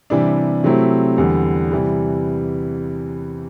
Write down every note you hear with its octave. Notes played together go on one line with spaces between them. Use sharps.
C3 E3 G3 D4
C3 F#3 A3 C4 E4
E2 D3 G3
C3 E3 G3